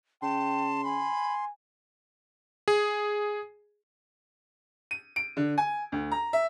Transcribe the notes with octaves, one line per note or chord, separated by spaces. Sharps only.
C#3 G5 A5 C6
G#5 B5
G#4
D#7
D7
D3
G#5
D2
A#5
E5